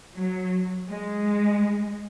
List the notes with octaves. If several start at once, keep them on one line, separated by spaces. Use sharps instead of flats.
F#3
G#3